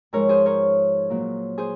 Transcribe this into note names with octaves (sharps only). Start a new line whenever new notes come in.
G#2 F3 G#3 A#4 C#5
G#4 C5
A#4 C#5
A#2 F#3 A#3
G#4 C5